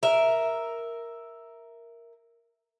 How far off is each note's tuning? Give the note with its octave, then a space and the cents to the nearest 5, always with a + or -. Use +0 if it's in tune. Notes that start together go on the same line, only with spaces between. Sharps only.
A#4 +0 E5 +0